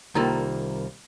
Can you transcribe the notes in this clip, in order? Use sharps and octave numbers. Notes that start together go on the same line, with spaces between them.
C2 D#3 G3 A#3 F4 A4